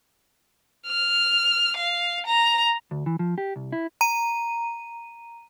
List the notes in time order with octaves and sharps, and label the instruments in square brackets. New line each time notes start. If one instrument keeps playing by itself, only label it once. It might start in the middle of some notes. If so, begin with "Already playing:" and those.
[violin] F6
F5
A#5
[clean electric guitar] D2
E3
F3
G4
C2
E4
[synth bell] A#5 D#7